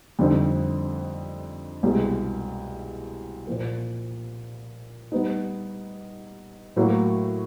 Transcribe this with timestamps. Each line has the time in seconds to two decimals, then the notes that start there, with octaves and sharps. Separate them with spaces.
0.19 F2 D3 G3 C4 D#4
1.83 C2 B2 G#3
3.47 A#2 F3 A#3
5.12 G3 B3 D#4
6.76 A2 F#3 A#3